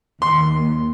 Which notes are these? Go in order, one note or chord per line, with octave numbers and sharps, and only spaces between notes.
D#2 C6